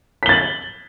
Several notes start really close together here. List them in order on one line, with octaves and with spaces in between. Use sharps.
B6 G7 A6 F#7